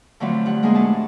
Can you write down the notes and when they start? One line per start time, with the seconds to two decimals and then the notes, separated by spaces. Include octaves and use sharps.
0.20 D3 F3 F#3 A3 B3 C4
0.46 G2 F#5
0.63 G#3 A#3 C4 D4 G#4
0.75 A2 A3 A5